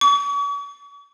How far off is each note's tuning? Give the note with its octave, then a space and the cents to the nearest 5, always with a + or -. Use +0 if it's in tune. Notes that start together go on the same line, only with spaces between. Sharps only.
C#6 +45